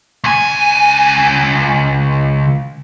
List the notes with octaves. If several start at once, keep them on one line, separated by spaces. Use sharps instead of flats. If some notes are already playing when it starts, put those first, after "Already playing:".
C#2 G#5